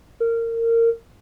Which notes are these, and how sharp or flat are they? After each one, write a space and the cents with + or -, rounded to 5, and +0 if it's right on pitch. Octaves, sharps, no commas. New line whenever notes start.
A#4 -20